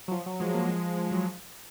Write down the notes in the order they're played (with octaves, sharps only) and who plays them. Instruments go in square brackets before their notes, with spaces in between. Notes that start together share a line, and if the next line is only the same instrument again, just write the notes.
[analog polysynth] F#3
F3
F#3
F3 G#3
F#3 A#3
F3 G#3
F3
F#3